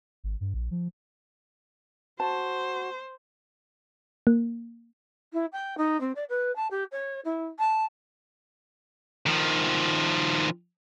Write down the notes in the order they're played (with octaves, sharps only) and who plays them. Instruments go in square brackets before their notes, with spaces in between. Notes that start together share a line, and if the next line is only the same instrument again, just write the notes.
[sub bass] G#1
G2
A#1
F3
[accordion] F#4 [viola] C5 [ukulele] A5
[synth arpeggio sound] A#3
[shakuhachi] E4
G5
D#4
C4
D5
B4
A5
G4
C#5
E4
A5
[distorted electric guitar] D#3 F3